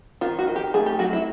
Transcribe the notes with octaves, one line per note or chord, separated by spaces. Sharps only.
D#3 F4
F#4
D#3
G4
A3 G#4
G4
F#3 F#4
E4